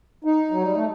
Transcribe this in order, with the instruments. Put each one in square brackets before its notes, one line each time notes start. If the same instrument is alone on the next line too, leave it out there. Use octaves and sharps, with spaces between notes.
[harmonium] D#4
F#3
G3
A3